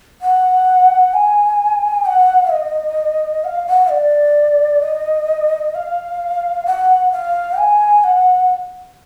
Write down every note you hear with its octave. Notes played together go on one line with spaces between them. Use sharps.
F#5
G#5
F#5
D#5
F#5
F5
F#5
D5
D#5
F5
F#5
F5
G#5
F#5